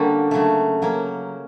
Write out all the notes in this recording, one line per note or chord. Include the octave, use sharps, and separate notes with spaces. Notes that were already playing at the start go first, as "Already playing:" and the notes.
Already playing: D3 G3 A#3 C#4 F#4
C#3 F#3 A3
F#3 A#3 C#4